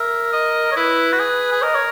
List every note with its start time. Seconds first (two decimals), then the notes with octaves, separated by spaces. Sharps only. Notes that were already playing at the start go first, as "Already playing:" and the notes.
Already playing: A#4 E5
0.33 D#5
0.72 C#5
0.76 E4 B4
1.13 F#4
1.20 G#4
1.52 G#4
1.62 A#4 D#5
1.75 C#5